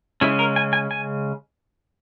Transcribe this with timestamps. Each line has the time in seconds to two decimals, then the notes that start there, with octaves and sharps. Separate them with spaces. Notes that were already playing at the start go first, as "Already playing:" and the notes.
0.21 C#3 G#3 C#4 E4
0.39 A#4
0.56 G#5
0.73 G#5
0.91 G#5